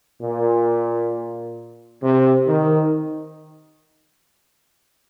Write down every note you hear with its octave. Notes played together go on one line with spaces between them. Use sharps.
A#2
C3
D#3